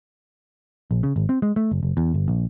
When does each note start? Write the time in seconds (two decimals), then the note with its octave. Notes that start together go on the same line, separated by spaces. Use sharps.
0.91 A#1
1.03 C#3
1.16 G#1
1.29 C4
1.42 G#3
1.56 A3
1.71 F#1
1.83 F#1
1.97 E2
2.14 G1
2.28 A#1